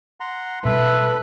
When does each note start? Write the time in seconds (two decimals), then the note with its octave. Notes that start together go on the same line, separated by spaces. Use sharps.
0.20 F#5 A#5 C6
0.65 B2 G3 A4 B4 E5 B5